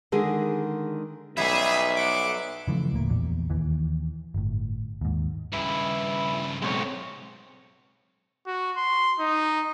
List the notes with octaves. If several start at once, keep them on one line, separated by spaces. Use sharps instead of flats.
D3 D#3 G#3 G#4
B1 G3 B3 E4 G#4 E5
F#5 C6 D6
C#3 E3 F3 A3
D1 A2 A#3
A#1 E2 A#2
D#2 E3
G1 A2
D#2 G#2
G2 C#3 E4
B1 G#3 C4 C#5
F#4
C6
D#4